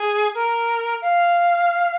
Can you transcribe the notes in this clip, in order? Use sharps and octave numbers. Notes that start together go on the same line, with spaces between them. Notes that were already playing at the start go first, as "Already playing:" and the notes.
Already playing: G#4
A#4
F5